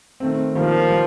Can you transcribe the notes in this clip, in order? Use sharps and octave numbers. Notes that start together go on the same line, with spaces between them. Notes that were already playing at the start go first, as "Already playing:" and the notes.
D#3 A3 C4
D#3 F3 G3 A#3 F4 A#4
G3